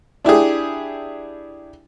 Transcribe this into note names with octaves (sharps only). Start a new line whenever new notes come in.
D4 E4 G4 G#4